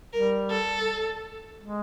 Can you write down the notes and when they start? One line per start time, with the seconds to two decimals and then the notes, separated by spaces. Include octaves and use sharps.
0.13 G3 A#4
0.50 A4
1.61 G#3